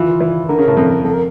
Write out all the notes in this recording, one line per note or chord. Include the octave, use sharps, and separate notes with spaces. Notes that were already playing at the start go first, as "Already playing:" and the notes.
Already playing: E3 F4
E3
D3 A#4
C#3
A2
F2
F2 A4
A#4